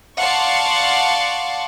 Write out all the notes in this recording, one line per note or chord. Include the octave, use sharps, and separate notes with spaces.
D5 F5 F#5 A5 C6 C#6